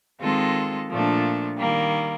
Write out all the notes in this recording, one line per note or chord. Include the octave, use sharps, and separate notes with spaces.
D#3 G#3 C4 F4 A4
A#2 F3 A3 D4
D#3 G3 A#3